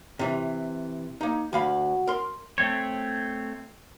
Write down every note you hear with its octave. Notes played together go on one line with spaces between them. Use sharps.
C3 E3
A#3 D#4
D2 F#4 F5 B5
A#4 C6
A3 C4 C#5